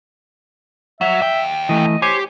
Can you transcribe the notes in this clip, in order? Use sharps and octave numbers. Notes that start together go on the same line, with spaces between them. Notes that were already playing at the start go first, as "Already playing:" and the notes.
F#3 E5
D#2 G5
E3 A3 D#5
G4 C5 C#5 G#5